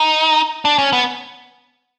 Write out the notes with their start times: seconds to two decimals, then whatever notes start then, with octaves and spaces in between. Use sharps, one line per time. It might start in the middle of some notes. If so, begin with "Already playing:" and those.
Already playing: D#4
0.65 D4
0.79 C#4
0.93 B3